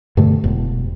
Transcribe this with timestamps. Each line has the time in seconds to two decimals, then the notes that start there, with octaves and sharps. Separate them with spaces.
0.17 G2 B2 D3 A3
0.44 E1